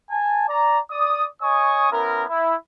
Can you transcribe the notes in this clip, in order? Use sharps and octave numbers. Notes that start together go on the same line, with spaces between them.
G#5 A5
D5 A#5
D5 D#6
C#5 D#5 G#5 C#6 D#6
B3 C#4 E4 A#4
E4